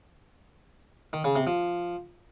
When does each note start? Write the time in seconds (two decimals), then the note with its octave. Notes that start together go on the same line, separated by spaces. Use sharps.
1.13 D#3
1.24 C#3
1.36 C3
1.47 F3